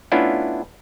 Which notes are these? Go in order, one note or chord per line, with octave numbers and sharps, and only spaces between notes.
A3 B3 C#4 D4 E4 F4